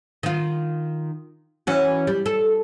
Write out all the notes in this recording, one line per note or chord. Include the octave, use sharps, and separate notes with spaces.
D#3 F4
E3 C#4 F#4
G3
A4